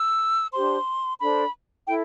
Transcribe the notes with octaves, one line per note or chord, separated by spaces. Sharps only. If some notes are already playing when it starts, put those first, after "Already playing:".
Already playing: E6
D4 G4 C5 C6
D4 A4 C5 B5
E4 A4 G5